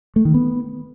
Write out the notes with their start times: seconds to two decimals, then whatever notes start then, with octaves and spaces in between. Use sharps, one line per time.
0.16 A3
0.25 D#3
0.34 B3